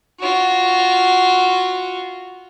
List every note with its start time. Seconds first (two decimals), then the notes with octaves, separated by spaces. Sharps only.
0.20 F4 F#4